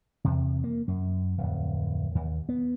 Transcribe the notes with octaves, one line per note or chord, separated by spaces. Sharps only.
E2 C3
A#3
F#2
D1 F2
D#2
B3